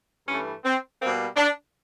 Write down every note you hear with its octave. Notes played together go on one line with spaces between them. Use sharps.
G2 E3 A3 C#4
C4
B2 G3 A#3 C4
D4